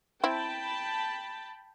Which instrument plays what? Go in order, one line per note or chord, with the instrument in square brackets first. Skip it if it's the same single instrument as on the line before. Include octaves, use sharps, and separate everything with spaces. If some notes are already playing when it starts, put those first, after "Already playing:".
[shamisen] C4 E4 [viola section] G5 A5 B5